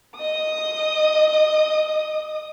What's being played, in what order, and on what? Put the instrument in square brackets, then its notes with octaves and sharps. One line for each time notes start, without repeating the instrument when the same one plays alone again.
[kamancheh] D#5 D#6